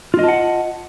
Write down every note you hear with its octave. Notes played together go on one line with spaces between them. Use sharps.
F4 D#5 F#5 A5